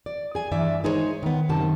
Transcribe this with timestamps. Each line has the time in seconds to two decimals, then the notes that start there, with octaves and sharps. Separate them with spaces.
0.06 D5
0.35 G#4 G#5
0.51 G2 E3 D5 E5
0.84 G#3 D#4 G#4 A4 C5 C#5
1.23 D#3 B3
1.49 F#2 C3 D#3 A5